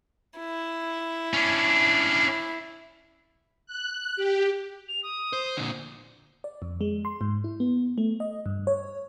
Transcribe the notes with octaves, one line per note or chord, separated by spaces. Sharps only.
E4
C#4 D4
F#6
G4
F7
D#6
C5
A#2 D3
D5
F2
G#3
C6
G#2
E4
B3
A3
D#5
G2
C#5